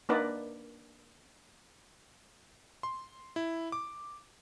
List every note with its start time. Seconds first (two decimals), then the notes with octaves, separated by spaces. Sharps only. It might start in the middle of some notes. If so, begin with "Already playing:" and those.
0.09 A#3 D4 D#4 B4 D5 F#5
2.83 C6
3.36 E4
3.72 D6